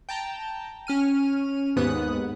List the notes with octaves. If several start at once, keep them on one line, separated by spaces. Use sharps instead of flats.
G5 A5 A#5
C#4 F6 D#7
D#2 G#2 B3 D#6 F#6